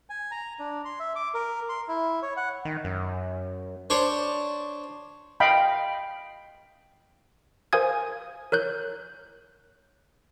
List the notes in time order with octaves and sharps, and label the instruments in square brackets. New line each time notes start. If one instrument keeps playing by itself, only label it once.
[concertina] G#5
A#5
D4
C6
E5
D6
A#4
C6
E4
C#5
F#5
[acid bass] D#3
F#2
[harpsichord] D4 C5 C#5
[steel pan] D#5 F5 G5 B5
[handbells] A#4 C5 F5 G#5 D#6 G#6
A#4 C#5 F#6 G6